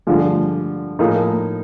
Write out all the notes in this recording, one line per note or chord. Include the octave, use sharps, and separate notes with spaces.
G2 D3 F3 G#3
A2 F3 A#3 D#4 G#4